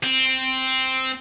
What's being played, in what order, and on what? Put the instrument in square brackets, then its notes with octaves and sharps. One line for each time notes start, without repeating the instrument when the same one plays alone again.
[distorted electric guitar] C4